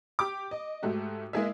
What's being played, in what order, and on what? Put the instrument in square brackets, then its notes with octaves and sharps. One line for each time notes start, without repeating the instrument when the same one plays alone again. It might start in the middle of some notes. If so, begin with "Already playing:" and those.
[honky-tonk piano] G4 D6
D#5
G#2 A3 F#4 G4
G#3 A#3 E4 G#4 D#5 E5